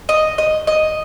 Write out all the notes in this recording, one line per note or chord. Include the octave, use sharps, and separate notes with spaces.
D#5
D#5
D#5